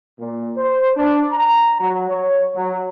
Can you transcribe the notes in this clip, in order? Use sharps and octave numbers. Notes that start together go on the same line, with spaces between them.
A#2
C5
D4
A#5
F#3
C#5
F#3